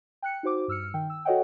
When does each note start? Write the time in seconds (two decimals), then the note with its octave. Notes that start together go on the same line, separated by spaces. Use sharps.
0.22 G5 F#6 C#7
0.43 D#4 F#4 C5 D6
0.68 G2 E6 F6 C#7
0.94 D#3 G5
1.10 E6
1.25 F#4 A4 C#5 D#5 F#5 G5